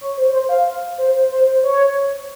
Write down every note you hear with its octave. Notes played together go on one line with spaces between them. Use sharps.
C#5
C5
C5
F5
C5
C5
C#5